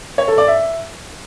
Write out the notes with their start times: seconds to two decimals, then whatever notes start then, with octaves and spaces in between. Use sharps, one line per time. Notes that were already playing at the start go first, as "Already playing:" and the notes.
0.18 C#5
0.28 A4
0.38 D5
0.48 E5